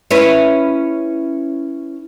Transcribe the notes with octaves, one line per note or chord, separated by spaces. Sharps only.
C#4 E4 B4